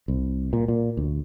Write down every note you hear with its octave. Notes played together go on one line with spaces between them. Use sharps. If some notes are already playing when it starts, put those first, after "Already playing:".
C2
A#2
A#2
D2